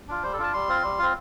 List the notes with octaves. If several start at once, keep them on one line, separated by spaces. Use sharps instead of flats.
D4 F4
G3 C5
A4
D4 F4 A5
G3 C6
C4 F4
G3
C4 F4